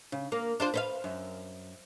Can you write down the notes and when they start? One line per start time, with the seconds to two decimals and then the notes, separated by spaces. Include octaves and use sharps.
0.12 C#3
0.32 A#3
0.60 D4 F4 C5
0.74 B4 C5 F5
1.04 F#2